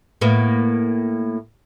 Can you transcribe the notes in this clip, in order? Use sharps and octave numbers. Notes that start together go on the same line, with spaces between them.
A2 A#3 B3